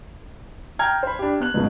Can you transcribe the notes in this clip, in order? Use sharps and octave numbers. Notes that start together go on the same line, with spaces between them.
G5 A#5 F6 G6 G#6
C5 B5
D4 G4
B3 F#6 F#7
C#2 G#2 B2